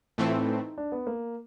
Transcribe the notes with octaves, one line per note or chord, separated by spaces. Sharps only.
A2 E3 A3 C4 F4
E4
D#4
D4
B3
A#3